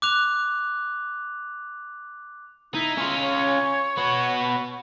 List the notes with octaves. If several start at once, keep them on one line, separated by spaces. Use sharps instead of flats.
D6 F#6 F7
D#4 E4
C#4 F4
C#5
B3 F#4